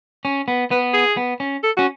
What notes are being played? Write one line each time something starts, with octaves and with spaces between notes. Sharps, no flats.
C#4
B3
B3 B4
G#4
B3
C#4
A4
C#4 F#4